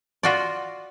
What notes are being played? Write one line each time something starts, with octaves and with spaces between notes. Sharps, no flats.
F4 F#4 D5